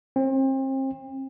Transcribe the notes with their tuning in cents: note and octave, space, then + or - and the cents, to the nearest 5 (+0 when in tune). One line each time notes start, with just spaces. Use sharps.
C4 +35